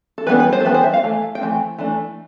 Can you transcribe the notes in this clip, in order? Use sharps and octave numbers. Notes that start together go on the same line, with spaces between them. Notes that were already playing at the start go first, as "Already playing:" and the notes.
A4
E3 G3 B3 D4 B4
B4
C5
A4
E3 G3 B3 D4 B4
C5
E5
F5
E3 A3
G5
E3 A3 C4
E3 A3 D4